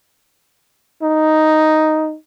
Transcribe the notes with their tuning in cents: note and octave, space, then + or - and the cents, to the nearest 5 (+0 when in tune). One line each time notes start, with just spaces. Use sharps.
D#4 +0